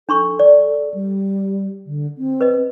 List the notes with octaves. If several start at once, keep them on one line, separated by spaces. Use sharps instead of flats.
D4 A4 C6 C#6
D5
G3
D3
C4
B4 D#5